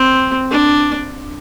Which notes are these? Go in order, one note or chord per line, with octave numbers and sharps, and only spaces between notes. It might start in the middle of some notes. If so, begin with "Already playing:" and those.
Already playing: C4
D4